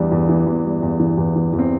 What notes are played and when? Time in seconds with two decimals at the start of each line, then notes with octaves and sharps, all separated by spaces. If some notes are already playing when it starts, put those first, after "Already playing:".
Already playing: E2 E3 G3 D4
0.12 E2
0.29 E3
0.46 E2
0.65 G3
0.82 E2
1.00 E3
1.17 E2
1.35 E3
1.53 E2
1.59 C4